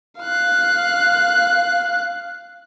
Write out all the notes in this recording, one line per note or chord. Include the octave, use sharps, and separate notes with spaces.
F5 F#6